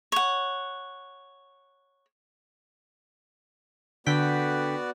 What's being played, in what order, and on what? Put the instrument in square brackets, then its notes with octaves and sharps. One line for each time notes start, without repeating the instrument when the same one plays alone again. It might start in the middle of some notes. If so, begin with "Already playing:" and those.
[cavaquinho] C#5 F#5
[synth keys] D3 G5 B6 [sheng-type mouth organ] B3 F#4 D5